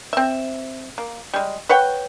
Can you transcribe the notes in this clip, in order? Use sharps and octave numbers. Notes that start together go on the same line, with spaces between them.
C4 E5
A#3
G3 G#3
B4 C#5 F#5 G5